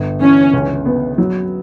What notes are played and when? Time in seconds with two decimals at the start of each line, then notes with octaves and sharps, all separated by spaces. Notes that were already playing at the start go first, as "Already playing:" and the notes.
Already playing: G1
0.21 E3 C#4
0.53 C#2
0.86 B3
1.18 F#3